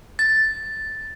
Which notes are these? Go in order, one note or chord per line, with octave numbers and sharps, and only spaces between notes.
A6